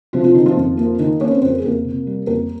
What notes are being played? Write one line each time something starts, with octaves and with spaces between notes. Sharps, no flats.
C3 F3 F4
F3 F4
D#3 D#4
F3 F4
F2
A#3
D#3 D#4
A#3 C#4 C#5
C4 C5
F2 C5
A#4
G#4
F2 A#3 A#4
C3
G3
F2 A#3 A#4